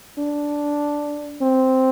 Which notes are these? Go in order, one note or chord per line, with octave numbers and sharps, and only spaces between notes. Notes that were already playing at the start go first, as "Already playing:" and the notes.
D4
C4